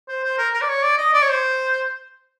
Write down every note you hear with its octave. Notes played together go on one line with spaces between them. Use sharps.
C5
C5
A#4
A#4
D5
C#5
D5
D#5
D5
C#5
C5